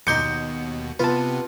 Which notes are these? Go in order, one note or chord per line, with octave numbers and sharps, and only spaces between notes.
D#2 B2 D#4 C6 D6 G6 C#7
C3 B3 F4 B4 A5